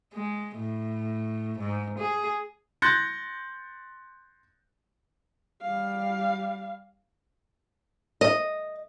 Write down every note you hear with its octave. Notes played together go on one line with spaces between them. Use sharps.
G#3
A2
G#2
G#4
C6 F#6 G6 A6 A#6 C#7
G3 F5
D#5